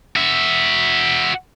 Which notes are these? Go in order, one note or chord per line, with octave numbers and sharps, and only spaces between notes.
F#4 E5